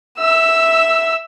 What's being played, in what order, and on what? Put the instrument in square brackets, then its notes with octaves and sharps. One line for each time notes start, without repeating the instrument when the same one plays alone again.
[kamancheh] E5 E6